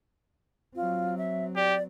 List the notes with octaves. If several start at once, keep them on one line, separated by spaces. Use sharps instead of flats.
F#3 C4 F4
E5
G4 D5